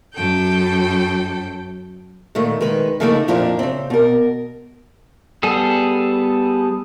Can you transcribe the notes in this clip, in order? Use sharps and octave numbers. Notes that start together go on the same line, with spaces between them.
F#2 A4 G5
A#2 D#3 A3
D#3 G#3 B4
C#3 F3 A3 A#3 D#4 E4
F2 A#2 F3 D4 E4 A#5
C#3 C4
B2 A#4
G3 B3 G#4 A4